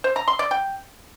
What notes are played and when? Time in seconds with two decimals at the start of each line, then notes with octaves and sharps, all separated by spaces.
0.04 C5
0.16 A#5
0.28 C6
0.39 D5
0.51 G5